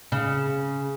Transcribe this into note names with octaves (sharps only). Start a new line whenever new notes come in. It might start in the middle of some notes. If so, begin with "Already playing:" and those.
C#3